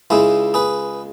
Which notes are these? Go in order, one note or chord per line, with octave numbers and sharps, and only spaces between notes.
C#2 C#3 G#3 E4 G#4
G#4 B4